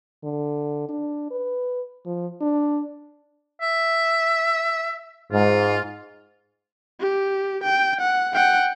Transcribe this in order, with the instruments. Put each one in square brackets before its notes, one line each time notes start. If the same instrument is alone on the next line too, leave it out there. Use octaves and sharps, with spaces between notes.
[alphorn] D3
D4
B4
F3
D4
[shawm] E5
[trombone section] G#2 [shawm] F4
[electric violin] G4
G5
F#5
F#5 G5